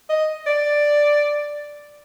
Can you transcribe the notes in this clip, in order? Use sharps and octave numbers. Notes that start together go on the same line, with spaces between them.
D#5
D5